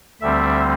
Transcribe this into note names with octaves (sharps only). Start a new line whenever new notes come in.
D2 D3 G3 C4 E5